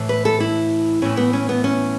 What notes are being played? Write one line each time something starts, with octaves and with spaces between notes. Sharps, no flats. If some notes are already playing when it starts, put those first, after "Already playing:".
Already playing: A2 E3
B4
A4
E4
A2 E3 C#4
B3
C#4
B3
C#4